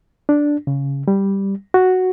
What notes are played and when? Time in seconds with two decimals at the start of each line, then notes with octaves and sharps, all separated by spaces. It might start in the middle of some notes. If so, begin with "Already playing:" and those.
0.29 D4
0.67 C#3
1.08 G3
1.74 F#4